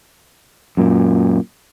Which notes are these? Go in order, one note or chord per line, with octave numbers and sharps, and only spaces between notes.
F#2 A#2